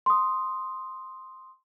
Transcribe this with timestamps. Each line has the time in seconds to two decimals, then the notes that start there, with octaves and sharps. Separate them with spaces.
0.06 C6 D#6